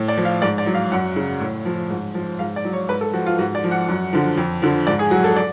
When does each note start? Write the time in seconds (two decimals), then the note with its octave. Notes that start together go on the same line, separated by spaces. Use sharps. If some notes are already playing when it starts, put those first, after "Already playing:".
Already playing: A2
0.08 D5
0.17 F3
0.25 F5
0.42 G#2 D5
0.58 D5
0.66 F#3
0.75 F5
0.92 F#2 F#5
1.16 C#3 F#3
1.41 A2
1.65 F3
1.90 G#2
2.14 F3
2.39 G#2 F5
2.56 D5
2.65 F#3
2.73 C#5
2.89 G#2 B4
3.01 A4
3.14 F3 F#4
3.26 F4
3.39 G#2 F#4
3.55 D5
3.64 F3
3.71 F#5
3.88 F#2
4.13 D3 F3
4.37 F2
4.62 D3 F3
4.87 G#2 D5
4.99 G#4
5.11 F#3 F#4
5.24 A4
5.37 D5